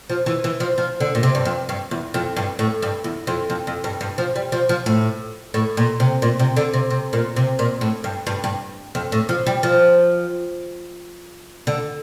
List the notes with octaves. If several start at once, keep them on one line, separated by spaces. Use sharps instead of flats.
F3
E3
E3
F3
F3
D3
A#2
C3
G2
F2
G2
E2
F2
G2
A2
G2
E2
F2
F2
F2
G2
G2
F3
G3
F3
F3
A2
A2
A#2
C3
A#2
C3
D3
C3
C3
A#2
C3
A#2
A2
G2
G2
G2
F2
A2
F3
G3
F3
D3